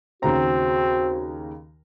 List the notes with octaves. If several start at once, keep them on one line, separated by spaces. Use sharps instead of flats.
D#2 C#3 C4 F#4 A#5